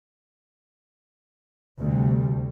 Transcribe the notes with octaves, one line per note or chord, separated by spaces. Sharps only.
D2 C3 G3